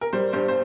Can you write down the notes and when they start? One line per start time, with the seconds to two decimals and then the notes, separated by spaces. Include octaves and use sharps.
0.01 A#4
0.13 G3 C5
0.33 G2 C5
0.48 C5